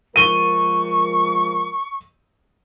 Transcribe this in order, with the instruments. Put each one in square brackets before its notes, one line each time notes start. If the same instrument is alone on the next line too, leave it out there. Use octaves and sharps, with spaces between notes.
[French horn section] F3 G#3 A#4 [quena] C#6 [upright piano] D#7 G7